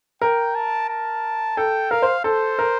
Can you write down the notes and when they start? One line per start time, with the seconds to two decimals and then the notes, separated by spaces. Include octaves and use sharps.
0.22 A#4 G5
0.55 A5
0.89 A5
1.57 A4 G5
1.91 A#4 F5
2.02 C5
2.24 A4 C5
2.59 A#4